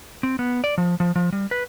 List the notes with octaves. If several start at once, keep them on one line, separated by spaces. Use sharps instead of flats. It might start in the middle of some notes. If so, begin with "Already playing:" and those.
C4
B3
D5
F3
F3
F3
G3
B4